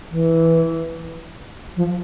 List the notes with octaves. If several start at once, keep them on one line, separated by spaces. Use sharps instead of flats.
E3
F3